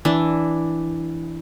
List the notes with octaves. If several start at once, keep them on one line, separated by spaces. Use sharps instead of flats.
E3 D4